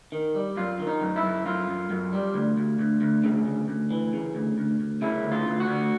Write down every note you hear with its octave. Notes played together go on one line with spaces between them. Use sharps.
D#3
G3
F#2 F4
D#3
D#4
F#2
E4
F#2
F#2 F4
F#2
F#2
G3
D2
D2
D2
D2
C#3
D2
D2
E3
C#3
D2
D2
D2
C#3 E4
D2
F4
D2
F#4
D2